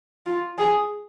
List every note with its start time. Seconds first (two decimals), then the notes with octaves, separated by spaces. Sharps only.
0.26 F4
0.58 G#4